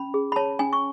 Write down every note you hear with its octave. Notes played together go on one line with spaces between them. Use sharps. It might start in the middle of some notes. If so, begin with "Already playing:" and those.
Already playing: C#4 B5
G#4
B5
C#5 A5
C#4 G#5
C#6